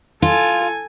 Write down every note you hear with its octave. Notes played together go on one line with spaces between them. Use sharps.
F4 A4 G#5